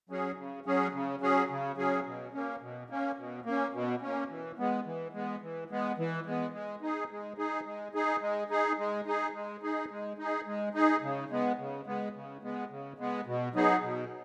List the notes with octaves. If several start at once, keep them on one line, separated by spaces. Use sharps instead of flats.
F#3 C#4 G#4
C#3
F#3 C#4 G#4
C#3
F#3 C#4 G#4
C#3
F#3 C#4 G#4
B2
A#3 C#4
B2
A#3 C#4
B2
A#3 C#4
B2
A#3 C#4
E3
G#3 B3
E3
G#3 B3
E3
G#3 B3
E3
G#3 B3
G#3
D#4 G#4
G#3
D#4 G#4
G#3
D#4 G#4
G#3
D#4 G#4
G#3
D#4 G#4
G#3
D#4 G#4
G#3
D#4 G#4
G#3
D#4 G#4
C#3
G#3 B3
C#3
G#3 B3
C#3
G#3 B3
C#3
G#3 B3
B2
F#3 B3 D#4 G#4
B2